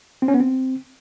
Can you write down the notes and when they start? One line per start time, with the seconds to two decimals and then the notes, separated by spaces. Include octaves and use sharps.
0.22 C4
0.28 C#4
0.34 B3
0.40 C4